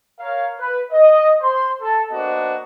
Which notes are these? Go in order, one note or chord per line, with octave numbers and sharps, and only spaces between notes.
A#4 C#5 F5
B4
D#5
C5 C6
A4
A#3 B3 D4 F#4 C5 D#5